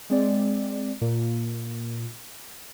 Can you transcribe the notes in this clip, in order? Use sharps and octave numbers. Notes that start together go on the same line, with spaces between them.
G#3 C4 D5
A#2